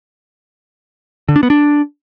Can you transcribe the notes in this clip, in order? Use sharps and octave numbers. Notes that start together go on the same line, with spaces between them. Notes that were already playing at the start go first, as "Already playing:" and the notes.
D3
D4
B3
D4